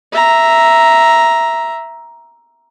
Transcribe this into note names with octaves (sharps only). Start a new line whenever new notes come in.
E5 A#5